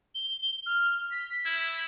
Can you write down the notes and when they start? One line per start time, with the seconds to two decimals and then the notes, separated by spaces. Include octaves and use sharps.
0.15 G7
0.66 F6
1.11 B6
1.45 E4